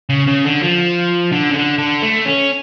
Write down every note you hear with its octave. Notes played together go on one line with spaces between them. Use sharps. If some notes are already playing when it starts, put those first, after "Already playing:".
C#3
C#3
D3
F3
D3
C#3
D3
D3
A3
C#4